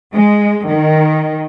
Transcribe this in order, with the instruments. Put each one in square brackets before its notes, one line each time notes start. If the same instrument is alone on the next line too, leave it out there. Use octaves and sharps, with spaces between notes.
[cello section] G#3
D#3